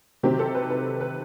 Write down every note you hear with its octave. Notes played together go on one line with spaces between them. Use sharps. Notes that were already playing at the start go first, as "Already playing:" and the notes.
C3 D#3 F#3 C4 G4
A4
B4
B4
B4